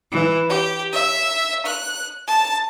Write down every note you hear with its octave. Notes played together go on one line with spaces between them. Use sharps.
E3
G4
E5
F#6
A5